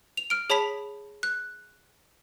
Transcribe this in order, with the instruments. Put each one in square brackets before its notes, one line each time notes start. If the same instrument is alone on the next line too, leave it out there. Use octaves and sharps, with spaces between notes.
[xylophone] F7
F6 D7
G#4 C#5 A5 B5 B6 F7
F#6